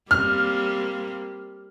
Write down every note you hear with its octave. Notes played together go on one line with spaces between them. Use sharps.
G3 A#3 C4 F6